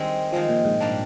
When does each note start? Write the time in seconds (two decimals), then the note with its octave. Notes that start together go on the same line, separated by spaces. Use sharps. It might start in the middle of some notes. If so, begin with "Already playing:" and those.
Already playing: D#3 G3 G#3 C4
0.32 D#3 F3 G#3 C4
0.49 A#2
0.65 G#2
0.80 G3 A#3 D4